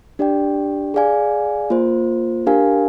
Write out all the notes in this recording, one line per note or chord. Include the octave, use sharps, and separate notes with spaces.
D4 G4 D5 G5
G#4 D5 F5 G#5
A#3 F4 C5
D4 G4 A#4 F5 G#5